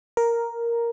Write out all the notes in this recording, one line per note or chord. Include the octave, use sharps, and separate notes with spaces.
A#4